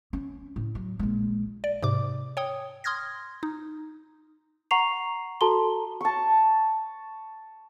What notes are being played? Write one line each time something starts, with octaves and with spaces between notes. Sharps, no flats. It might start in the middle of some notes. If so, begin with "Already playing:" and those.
C#4
A2
F#3
A#1 G#3
D5
G#2 C3 D6
C#5 G5 D#6
C6 D#6 F6 G#6 A#6
D#4
F#5 A#5 C#6 C7 F7
F#4 A4 A5 A#5 C6 G7
A5 C#6